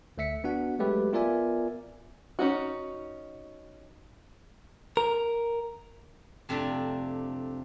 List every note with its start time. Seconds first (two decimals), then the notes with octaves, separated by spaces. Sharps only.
0.18 D2 A3 E5 B6 C#7
0.44 B3 D4 F#4 F#5
0.79 F#3 G#3 A3 G4 B4
1.13 B3 F4 A#4 D5 E5 G#5
2.39 C#4 D#4 F#4
4.97 A#4
6.49 F2 C3 A3 D4